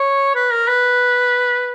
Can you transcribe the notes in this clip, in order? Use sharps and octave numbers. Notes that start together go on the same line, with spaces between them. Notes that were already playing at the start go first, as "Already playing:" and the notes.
Already playing: C#5
B4
A#4
B4